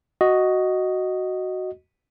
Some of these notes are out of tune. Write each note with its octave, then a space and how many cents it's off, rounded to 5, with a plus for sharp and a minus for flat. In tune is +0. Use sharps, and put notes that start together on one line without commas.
F#4 +5 D#5 +0